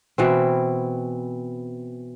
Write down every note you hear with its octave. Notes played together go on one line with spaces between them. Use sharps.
B2 E3 C4